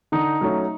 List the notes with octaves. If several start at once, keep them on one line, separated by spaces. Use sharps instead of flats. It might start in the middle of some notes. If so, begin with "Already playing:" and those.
D3 D#4
F#3 A3 C#4